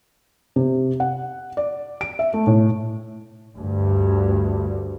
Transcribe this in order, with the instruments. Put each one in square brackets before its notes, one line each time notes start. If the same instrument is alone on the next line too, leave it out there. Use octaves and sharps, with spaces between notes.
[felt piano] C3
F#5
D5
D7
E5
A3
A2
[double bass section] D2 G2